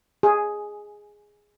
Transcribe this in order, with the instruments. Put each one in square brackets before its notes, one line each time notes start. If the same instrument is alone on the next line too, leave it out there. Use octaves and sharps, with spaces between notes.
[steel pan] G#4